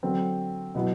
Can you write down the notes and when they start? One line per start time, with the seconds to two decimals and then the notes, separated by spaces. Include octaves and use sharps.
0.03 D3 F#3 C4
0.75 B2 F#3 B3 E4